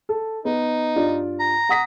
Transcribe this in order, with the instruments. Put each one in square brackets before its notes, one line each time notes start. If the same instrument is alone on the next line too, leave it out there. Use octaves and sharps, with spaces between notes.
[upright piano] A4
[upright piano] B3 [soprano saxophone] D#4
[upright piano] G2 F4 D5
[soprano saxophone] A#5
[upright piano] F#5 D#6 B6